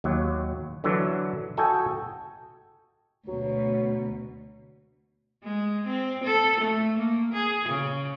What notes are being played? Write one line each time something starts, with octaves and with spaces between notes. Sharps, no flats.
D#2 F#3
D3 E3 F#3
F#4 A4 D#5 G5 G#5
D2 B2 F#3
G#3
C4
A4
A3
A#3
G#4
C#3